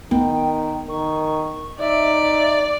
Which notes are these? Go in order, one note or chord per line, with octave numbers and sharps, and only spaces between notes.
D#3 B3 G5
D#3 C#6
D#4 D5 E5